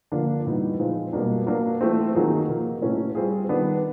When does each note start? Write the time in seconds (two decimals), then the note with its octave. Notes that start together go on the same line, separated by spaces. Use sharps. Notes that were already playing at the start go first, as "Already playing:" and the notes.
0.12 D3 F3 A#3 D4
0.46 A2 E3 G3 B3 D#4
0.79 A#2 F3 G#3 C4 D#4
1.13 B2 G3 A#3 D4
1.46 F#3 A#3 D4
1.81 E3 A3 C4
2.15 D#3 F#3 A#3 D#4 G#4
2.48 C3 F3 A#3
2.82 A2 F#3 A3 C#4 E4
3.15 G3 C4 F4 G#4
3.49 D#3 G3 B3 D4